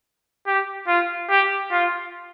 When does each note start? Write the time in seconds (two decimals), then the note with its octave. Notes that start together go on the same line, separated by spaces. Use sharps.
0.47 G4
0.87 F4
1.29 G4
1.71 F4